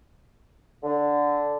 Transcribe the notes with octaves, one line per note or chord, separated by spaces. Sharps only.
D3